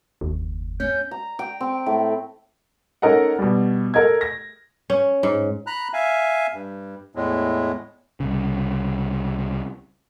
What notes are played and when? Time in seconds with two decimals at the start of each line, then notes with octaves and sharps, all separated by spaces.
0.21 F#1 D#2
0.80 C#4 G6
1.11 A#5
1.39 G5
1.61 C4
1.86 A2
3.02 C#4 D#4 A4 A#4 D#5 F#5
3.39 B2 G3
3.94 A4 A#4 D#5 G#6
4.21 A#6
4.90 C#4
5.23 G#2
5.67 A#5 B5 F#6
5.94 E5 F5 G#5
6.54 G2
7.15 E2 A2 G#3
8.20 C2 C#3